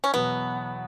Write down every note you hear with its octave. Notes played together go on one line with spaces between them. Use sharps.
C#4
E2 B2 F#3 B3